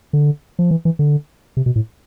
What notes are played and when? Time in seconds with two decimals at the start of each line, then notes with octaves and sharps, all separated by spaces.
0.13 D3
0.59 F3
0.71 E3
0.85 E3
0.99 D3
1.57 C3
1.66 B2
1.76 A2